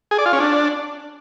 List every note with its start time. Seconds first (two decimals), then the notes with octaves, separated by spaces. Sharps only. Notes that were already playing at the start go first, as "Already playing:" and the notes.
0.11 G#4
0.18 D5
0.26 F4
0.33 C#4
0.40 D4